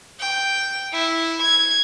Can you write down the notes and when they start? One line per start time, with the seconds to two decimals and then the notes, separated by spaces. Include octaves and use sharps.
0.20 G5
0.93 E4
1.42 G#6